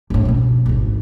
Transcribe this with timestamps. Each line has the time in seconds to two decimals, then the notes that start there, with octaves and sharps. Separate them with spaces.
0.10 G1 A2
0.25 B2 C#4
0.66 G#1 D2